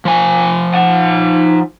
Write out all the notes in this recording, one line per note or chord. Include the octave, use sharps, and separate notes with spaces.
F3 G#5
D#4 F#5